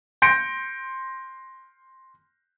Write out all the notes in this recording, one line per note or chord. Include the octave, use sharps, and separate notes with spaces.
C6 G6 A#6 C#7 D7